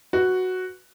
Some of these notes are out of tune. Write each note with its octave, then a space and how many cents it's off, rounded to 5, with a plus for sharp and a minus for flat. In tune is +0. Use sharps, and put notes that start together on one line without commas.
F#4 +0 B4 +0